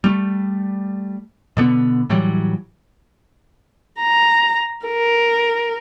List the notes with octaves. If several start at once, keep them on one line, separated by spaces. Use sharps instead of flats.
G3 A3
B2 D3 B3
A2 E3 F#3 G3
A#5
A#4